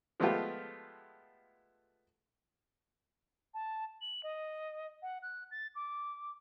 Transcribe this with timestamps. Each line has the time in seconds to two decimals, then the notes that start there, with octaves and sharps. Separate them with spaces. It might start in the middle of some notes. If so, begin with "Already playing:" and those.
0.20 F3 G#3 A3 B3 F4 G4
3.54 A5
4.01 F#7
4.23 D#5
5.02 F#5
5.22 F#6
5.51 A6
5.75 D6